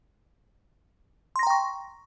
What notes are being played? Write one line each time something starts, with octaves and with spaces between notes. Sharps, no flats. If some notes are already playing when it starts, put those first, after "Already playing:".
G5 A#5 C6 C#6 A#6